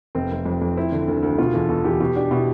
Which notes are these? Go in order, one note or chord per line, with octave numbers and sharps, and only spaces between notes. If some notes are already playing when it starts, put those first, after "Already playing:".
F1 C4
F1
F2
F2
C4 E4
D3
D2
D2
B2 F4
E2 A4
B2 A4
E2 G4
B2 G4
D4 G4
B2 E4